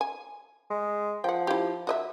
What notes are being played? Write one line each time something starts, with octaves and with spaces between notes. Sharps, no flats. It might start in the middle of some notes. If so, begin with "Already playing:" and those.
G#5
G#3
F3 F#5 G5
E4 G4
F#4 D#5 E5